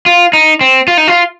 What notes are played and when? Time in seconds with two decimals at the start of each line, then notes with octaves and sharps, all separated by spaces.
0.06 F4
0.33 D#4
0.61 C4
0.88 F4
0.98 D#4
1.08 F4